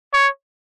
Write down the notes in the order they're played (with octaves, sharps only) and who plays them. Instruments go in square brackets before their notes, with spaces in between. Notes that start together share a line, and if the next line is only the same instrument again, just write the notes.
[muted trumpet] C#5